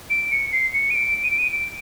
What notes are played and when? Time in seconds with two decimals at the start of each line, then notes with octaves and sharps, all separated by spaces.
0.10 D7
0.31 C#7
0.53 C7
0.74 C#7
0.91 D#7
0.95 D7
1.23 D#7
1.31 D7
1.38 D#7
1.52 D7